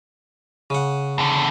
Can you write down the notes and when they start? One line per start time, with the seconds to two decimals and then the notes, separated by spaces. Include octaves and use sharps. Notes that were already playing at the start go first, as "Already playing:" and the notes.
0.70 C#3 F#5
1.18 E2 D3